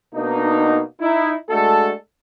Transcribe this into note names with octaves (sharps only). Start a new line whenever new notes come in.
B2 A#3 B3 D4 D#4
D#4 E4
G#3 A3 D4 F#4 A4